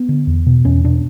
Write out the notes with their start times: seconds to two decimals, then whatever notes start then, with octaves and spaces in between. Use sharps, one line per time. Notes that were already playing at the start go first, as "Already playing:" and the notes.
Already playing: B3
0.09 D3
0.27 E2
0.46 B2
0.65 E2 C#4
0.84 B2 D4